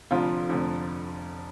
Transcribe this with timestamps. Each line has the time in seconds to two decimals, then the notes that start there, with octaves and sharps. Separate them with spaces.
0.11 F1 F2 D3 F3 F4
0.49 F1 F2 D3 F3